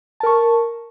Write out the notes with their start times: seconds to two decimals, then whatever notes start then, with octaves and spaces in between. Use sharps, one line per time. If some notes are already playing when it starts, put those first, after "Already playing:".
0.20 A5
0.23 A#4
0.26 C#6